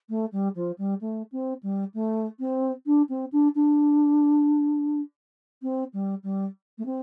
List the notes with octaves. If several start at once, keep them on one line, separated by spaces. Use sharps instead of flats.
A3
G3
F3
G3
A3
C4
G3
A3
C4
D4
C4
D4
D4
C4
G3
G3
A3
C4